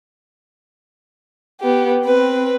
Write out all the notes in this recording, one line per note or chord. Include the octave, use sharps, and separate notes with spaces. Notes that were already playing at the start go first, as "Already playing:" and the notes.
B3 G4
C4 B4